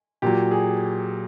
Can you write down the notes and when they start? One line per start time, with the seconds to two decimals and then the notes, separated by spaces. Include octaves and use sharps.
0.22 A#2 F#3 G4
0.51 G#4